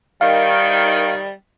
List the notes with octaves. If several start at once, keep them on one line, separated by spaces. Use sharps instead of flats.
D#3 G3 F5